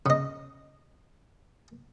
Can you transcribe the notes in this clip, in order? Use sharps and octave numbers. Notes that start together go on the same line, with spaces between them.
C#3 D#5